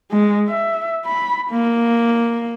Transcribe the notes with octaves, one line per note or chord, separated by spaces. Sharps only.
G#3
E5
B5
A#3